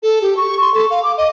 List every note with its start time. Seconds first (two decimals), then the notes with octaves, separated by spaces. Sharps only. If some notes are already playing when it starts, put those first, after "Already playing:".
0.03 A4
0.22 G4
0.37 C#6
0.61 C6
0.74 A4
0.91 F5
1.03 D6
1.18 D#5